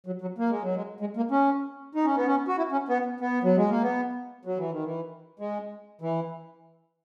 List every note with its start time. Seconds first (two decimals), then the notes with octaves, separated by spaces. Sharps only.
0.06 F#3
0.21 F#3
0.38 A#3
0.50 G#3
0.63 F#3
0.75 G#3
1.00 G#3
1.17 A#3
1.31 C#4
1.95 D#4
2.05 C#4
2.16 B3
2.26 C#4
2.48 F#4
2.58 E4
2.72 C#4
2.89 B3
3.20 B3
3.43 F#3
3.57 G#3
3.70 A#3
3.82 B3
4.45 F#3
4.58 E3
4.71 D#3
4.84 E3
5.39 G#3
6.01 E3